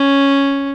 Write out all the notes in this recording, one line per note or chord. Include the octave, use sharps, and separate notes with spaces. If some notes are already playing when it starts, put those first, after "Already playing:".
Already playing: C#4